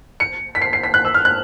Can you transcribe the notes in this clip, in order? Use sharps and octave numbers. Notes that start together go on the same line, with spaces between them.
C#7
B6
C7
C7
B6
F#6
E6
F6
F#6